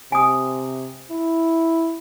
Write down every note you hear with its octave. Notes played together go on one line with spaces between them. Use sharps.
C3 G#5 D#6
E4